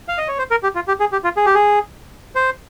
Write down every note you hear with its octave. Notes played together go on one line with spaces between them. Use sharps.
F5
D#5
C#5
C5
A#4
G4
F4
G4
G#4
G4
F4
G#4
G4
G#4
C5